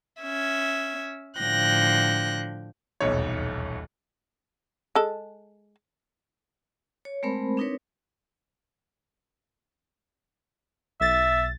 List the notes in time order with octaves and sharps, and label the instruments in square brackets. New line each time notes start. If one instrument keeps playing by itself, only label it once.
[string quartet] C#4 E5 G#6
A2 D3 F3 G5 F#6 A#6
[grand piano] D#1 B1 E2 D#4 C#5
[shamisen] G#3 A4
[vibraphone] C#5
G#3 A3 C4 A#4 C5 B5
C4 D4 D#4 A#4 B4 C#5
[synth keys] B1 A6 [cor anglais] E5